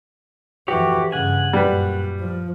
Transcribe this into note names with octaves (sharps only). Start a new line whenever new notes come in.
F2 E3 F#4 G4 C#5
G2 C#3 F#5 G#5
F#2 A#2 G3 B4
F3